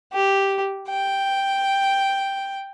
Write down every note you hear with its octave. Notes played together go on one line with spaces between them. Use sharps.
G4
G5